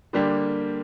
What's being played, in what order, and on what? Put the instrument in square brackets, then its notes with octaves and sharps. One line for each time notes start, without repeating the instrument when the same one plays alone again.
[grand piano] D3 G3 A#3 D4 G4